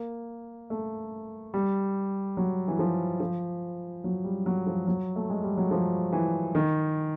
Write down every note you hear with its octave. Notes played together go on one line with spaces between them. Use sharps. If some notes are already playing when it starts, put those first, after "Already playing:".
Already playing: A#3
A3
G3
F#3
E3
F3
F3
F#3
G3
F#3
F3
F#3
A3
G#3
G3
F#3
F3
E3
D#3